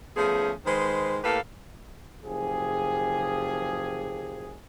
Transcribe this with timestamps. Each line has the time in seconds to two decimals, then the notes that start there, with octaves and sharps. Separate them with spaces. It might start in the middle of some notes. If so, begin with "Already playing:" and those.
0.16 F3 A3 B3 C#4 G#4
0.66 D#3 G#3 B4 C5
1.24 A2 A#3 G4 A4 B4 F5
2.24 F#1 F3 G4 G#4